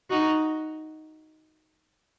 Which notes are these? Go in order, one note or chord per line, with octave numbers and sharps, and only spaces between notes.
D#4 F#4